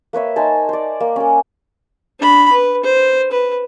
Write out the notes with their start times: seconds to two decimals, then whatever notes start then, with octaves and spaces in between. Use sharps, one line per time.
0.13 A#3 B4 C#5 E5
0.36 D#4 C5 G#5 A5
0.69 C5 D5
1.00 A#3
1.16 C#4 A#4
2.20 D4 B5
2.52 B4
2.84 C5
3.32 B4